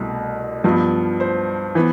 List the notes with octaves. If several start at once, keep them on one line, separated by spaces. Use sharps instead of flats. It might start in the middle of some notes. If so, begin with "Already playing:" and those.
Already playing: C2 B2 A3
G2 F3 B3
C5
E3 B3